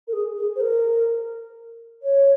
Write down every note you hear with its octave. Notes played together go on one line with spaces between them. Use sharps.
A#4
G#4
G#4
C5
A#4
C#5